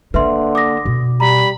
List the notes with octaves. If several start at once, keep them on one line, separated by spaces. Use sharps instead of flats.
D3 A#3 B4 E5 C6
D6 D#6 A#6
B2
G3 A#5 B5